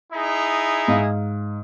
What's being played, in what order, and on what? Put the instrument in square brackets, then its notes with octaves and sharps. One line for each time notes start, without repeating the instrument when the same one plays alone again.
[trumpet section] D#4 E4 G#4
[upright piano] G#2 F5